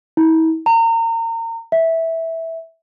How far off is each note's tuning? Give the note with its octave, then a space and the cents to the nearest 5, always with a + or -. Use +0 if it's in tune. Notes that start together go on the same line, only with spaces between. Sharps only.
E4 -40
A#5 -30
E5 -10